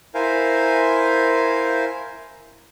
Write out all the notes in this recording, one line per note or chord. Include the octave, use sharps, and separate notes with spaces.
E4 A#4 C5 F5 G#5